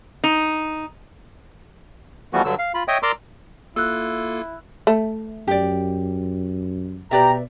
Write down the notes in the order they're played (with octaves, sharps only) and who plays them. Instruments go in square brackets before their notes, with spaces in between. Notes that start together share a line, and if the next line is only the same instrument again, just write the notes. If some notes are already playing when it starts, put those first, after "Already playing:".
[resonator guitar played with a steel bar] D#4
[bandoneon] E3 F3 G3 A3 B3 F#4
G2 D3 F#3 E6
F5
F4 B5
C#5 D#5 E5 G5 D#6
A#4 D5 A#5 C6 D6 E6
[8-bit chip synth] A#3 F4 A4 [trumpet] E4 [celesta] E6 F#6
[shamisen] A3
[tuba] F#2 [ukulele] G4 D5
[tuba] B2 [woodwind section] G4 A#5 [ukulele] B4 D5 E5